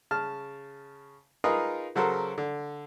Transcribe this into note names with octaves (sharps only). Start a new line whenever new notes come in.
C#3 A5 F6
D#4 F4 G#4 A#4 B4 D#5
C#3 F#3 F#4 A4 A#4 C5
D3